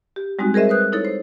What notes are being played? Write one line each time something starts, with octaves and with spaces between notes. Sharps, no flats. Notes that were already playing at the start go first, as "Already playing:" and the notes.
G4
G3 G#3 C4 D#4 F#4
G#4 A#4 C5 D#5 E5
B4 C5 D#6 F#6 G6
D#4 E4 A4 C#5
C5